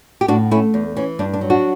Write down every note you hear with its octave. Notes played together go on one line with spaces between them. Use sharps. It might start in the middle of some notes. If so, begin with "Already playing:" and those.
G4
A2 D4 F#4
A3 C#4 E4
E2
E3 C#4
G2 D4
D4
F#3
D4 F#4